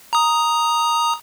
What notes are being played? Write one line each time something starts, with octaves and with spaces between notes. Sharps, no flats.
A#5 D#6